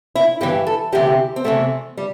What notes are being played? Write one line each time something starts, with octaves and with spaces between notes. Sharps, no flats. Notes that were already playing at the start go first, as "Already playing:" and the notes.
E4
G2 E3 G4
A4
D2 C3 E3 G4
C4
E2 C3 E3 A3
G3